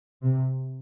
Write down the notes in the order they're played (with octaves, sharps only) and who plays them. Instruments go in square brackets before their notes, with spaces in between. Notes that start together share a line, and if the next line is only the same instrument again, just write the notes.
[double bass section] C3